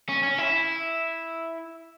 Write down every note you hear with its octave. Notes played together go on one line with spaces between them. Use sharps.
C#4
C#4
E4